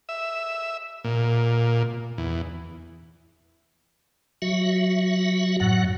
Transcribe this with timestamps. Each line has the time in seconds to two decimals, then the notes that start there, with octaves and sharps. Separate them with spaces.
0.09 E5
1.04 A#2
2.18 E2
4.42 F#3 F#4 E5
5.60 F#2 A2 F#3 F#5